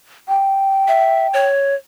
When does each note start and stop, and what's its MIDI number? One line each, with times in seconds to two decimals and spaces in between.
0.29 1.46 79
0.88 1.27 76
1.34 1.75 73